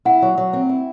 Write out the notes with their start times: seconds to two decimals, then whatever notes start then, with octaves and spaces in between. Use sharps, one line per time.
0.05 E4 F#5
0.22 F#3
0.38 F#3
0.53 C4
0.69 E4